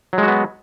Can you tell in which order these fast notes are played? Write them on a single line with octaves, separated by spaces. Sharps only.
F#3 G#3 F#4 B3